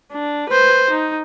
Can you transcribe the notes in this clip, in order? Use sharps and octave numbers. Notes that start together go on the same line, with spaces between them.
D4
B4 C5
D#4